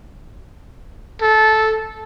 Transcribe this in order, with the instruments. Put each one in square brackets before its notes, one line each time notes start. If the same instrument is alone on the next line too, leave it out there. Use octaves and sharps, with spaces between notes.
[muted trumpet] A4